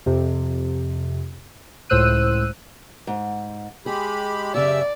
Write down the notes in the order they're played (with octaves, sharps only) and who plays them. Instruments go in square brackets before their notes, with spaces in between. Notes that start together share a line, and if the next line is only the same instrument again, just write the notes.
[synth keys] F2 C3
C#2 A2 C5 E6 F#6 D#7
[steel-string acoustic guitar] G#2
[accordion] G#3 G4 B5 [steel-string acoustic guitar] G#4
[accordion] F#2 E5 E6 [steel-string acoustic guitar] C#3 G4 [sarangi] D5